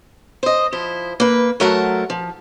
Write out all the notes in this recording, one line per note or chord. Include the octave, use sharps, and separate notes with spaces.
C5 D#5
F3 E4 C5
A#3 B4
F#3 A3 A#4 C5 F#5 A5
F3